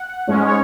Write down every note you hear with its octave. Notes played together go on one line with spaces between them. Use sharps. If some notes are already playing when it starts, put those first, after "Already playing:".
Already playing: F#5
G#2 G#3 C#4
C#5